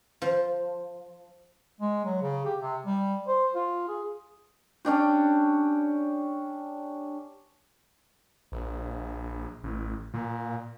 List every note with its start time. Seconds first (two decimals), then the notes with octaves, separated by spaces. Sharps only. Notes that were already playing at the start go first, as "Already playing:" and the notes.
0.22 F3
1.81 G#3
2.05 F#3
2.22 C#3
2.45 G4
2.61 C3
2.85 G3
3.28 C5
3.54 F4
3.88 G#4
4.85 C#4 D4 G4
8.52 A#1
9.64 A1
10.14 A#2